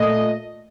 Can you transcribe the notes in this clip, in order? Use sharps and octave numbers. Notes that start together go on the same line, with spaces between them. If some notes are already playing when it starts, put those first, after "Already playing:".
Already playing: A#2 A3 D#5